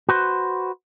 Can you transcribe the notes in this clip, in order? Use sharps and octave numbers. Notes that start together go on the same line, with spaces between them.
F#4 B4 C5